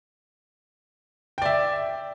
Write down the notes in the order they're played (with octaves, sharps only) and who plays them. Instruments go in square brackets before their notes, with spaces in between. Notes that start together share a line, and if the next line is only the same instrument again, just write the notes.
[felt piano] G5
D5
E5